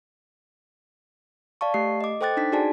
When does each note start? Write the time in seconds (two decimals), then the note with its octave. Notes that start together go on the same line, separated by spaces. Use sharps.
1.61 D5 F5 A5 C#6
1.74 A3 G4 C7
2.01 D#5 D6
2.21 A4 C5 G5 D6 F#6 A6
2.37 D4 D#4 B6
2.52 D#4 F#4 G#4 D5 G#5 A5